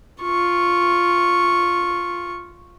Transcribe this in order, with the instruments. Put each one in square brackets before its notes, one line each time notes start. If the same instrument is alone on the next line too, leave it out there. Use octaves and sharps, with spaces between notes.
[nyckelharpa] F4 C#6